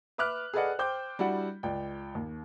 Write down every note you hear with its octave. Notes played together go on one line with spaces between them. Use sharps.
B4 E5 D6 F6 F#6
G#4 A4 B4 D5 D#5 F#5
C5 G5 D6 G6
G3 D4 E4 F#4 F#5
C#2 D5 G5
D#2